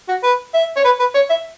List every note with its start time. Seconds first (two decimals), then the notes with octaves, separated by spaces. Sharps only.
0.08 F#4
0.23 B4
0.54 E5
0.76 C#5
0.84 B4
0.99 B4
1.15 C#5
1.30 E5